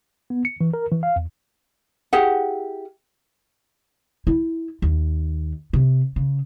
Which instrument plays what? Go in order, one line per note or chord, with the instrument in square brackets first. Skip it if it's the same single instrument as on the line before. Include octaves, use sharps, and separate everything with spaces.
[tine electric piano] B3
C#7
E3
A#4
E3
F5
E2
[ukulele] E4 G4 G#4 F#5
[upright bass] E4
D#2
C3
C#3